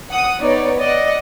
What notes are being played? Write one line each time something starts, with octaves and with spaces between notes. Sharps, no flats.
F#5 D#6
B3 D#4 C#5 D5
D5 D#5 F#5